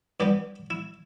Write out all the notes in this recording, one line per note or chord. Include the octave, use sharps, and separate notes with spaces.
G2 E3 G3 B3 G4
E4